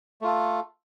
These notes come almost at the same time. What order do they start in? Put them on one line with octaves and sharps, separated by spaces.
A3 F4 A4